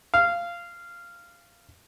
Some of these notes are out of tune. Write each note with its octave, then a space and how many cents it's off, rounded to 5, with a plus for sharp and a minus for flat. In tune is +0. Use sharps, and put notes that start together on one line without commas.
F5 -15